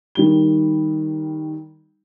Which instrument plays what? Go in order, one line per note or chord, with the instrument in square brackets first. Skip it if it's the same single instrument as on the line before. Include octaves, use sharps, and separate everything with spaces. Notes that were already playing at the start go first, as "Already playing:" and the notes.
[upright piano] D#3 G3 G7